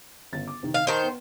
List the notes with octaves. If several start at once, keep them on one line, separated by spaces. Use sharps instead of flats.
G1 C#3 A6
D6
C3 D#3
F5
D#3 C5 D#5 A5
B3